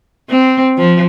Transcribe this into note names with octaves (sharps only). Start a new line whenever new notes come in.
C4
F3